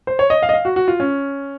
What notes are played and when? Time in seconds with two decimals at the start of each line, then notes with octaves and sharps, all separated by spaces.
0.07 C5
0.19 C#5
0.30 D#5
0.42 F5
0.49 D#5
0.54 F5
0.65 F#4
0.76 F#4
0.88 F4
1.00 C#4